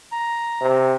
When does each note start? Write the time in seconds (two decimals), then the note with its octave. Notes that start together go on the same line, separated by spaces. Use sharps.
0.12 A#5
0.61 C3